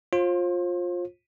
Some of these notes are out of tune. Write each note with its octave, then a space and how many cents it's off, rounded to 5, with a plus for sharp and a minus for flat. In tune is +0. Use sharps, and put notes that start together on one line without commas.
F4 +15 C5 +40